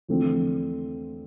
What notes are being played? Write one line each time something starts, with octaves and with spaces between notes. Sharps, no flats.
E2 D3 F3 A3 C4